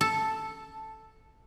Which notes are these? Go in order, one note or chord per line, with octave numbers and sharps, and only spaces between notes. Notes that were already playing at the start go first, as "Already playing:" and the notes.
A4